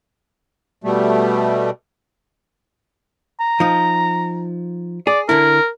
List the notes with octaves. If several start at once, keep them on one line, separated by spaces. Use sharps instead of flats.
B2 G3 A3
A#5
F3 D#4
G#4 D5
D3 E4 A#4